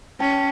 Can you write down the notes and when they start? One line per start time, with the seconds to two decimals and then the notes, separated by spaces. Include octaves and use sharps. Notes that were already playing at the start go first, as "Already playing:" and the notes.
0.20 C#4 G5 A5